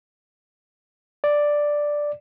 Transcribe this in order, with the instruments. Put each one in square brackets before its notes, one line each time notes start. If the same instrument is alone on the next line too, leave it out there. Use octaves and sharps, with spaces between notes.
[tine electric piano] D5